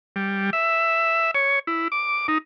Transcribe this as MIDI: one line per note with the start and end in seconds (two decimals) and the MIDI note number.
0.16 0.50 55
0.53 1.31 76
1.35 1.59 73
1.67 1.88 64
1.92 2.27 86
2.28 2.38 63